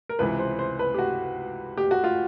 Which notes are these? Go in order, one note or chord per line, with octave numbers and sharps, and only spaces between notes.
A#4
C#2 C3 E3 B4
C5
C5
B4
G4
F#4
G4
F#4
F4